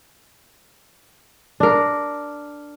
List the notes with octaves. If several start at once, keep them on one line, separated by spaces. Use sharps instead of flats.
D4 A#4